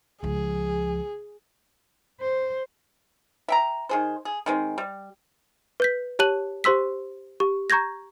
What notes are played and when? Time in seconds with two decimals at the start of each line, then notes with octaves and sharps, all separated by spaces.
0.23 C#2 F3 G#4
2.21 C5
3.48 E5 G5 A#5
3.89 D#3 G#4 C5
4.25 G#4
4.46 D#3 G#3 C4
4.78 G3
5.80 B4 G6 B6
6.19 G4 C#5 A5 F#6 D#7 F#7
6.64 G4 C5 C6 E6 B6
7.40 G4 C#6
7.70 A#5 C#6 G6 G#6 A#6